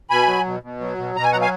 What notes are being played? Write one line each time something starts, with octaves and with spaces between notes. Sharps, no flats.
B2 G#5 B5
F#3
B2
B2
F#3
B2
B2 A#5
G#5
F#3 F#5 A#5
F5 G#5